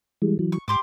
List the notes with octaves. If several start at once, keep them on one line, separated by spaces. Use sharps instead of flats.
E3 G3 G#3
E3 F#3
C#6
G#2 G4 C6 D6